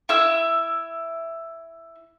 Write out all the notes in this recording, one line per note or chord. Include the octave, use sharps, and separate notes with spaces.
E4 E5 E6